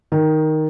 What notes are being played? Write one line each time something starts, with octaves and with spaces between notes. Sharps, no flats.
D#3